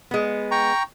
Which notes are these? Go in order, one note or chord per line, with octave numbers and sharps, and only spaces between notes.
G#3 B3
G5 A#5 C#6